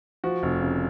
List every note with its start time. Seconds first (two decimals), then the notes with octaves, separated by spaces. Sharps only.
0.24 F3 F#4
0.43 F1
0.61 C#3